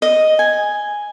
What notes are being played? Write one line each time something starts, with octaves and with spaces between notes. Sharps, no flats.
D#5
G#5